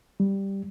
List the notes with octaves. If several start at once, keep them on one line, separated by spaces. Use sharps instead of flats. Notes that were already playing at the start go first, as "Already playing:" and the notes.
G3